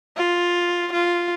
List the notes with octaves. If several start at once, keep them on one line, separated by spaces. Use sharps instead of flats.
F4
F4